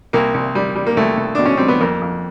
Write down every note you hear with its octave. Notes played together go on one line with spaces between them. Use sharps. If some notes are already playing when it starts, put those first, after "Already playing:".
C2 A#3
C2
G3
G3
A#3
C2 A3
C2
B2 D4
C#4
G3 C4
B3
F2 A#3
F2